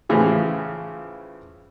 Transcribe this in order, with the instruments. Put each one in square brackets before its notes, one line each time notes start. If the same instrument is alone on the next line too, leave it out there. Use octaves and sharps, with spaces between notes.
[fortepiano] A2 C#3 E3 F3